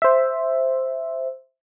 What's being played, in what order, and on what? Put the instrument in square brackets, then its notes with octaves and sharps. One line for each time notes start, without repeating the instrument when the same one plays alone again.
[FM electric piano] C5 E5